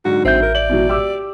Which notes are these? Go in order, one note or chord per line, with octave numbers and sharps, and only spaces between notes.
G#2 D3 F#3 F#4
A1 C4 E5 G6
A#4
D5 F#7
B2 E3 F#3
G4 D6 E6